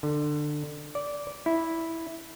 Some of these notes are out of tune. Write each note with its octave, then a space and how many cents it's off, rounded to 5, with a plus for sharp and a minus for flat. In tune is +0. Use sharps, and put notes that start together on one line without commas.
D3 +20
D5 -15
E4 -5